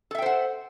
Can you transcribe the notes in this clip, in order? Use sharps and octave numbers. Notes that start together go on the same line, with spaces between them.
A4 C5 E5 F#5 G5